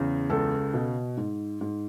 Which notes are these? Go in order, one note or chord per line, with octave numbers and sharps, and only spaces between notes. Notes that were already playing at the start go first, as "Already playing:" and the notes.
Already playing: E2 C#3
C#2 A4
B2
G#2
G#2